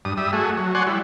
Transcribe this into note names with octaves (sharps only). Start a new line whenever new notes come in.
G2 D#6
G3 E5 D#6
A3 F#4 G#4
F#3
F#4 C#5 D5 F#5 G#5 C6
G3 E4